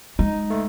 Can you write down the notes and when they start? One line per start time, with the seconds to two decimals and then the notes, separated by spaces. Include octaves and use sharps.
0.19 G#3 D#4
0.50 A3